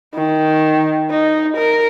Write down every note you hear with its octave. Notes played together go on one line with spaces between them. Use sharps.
D#3
D#4
A#4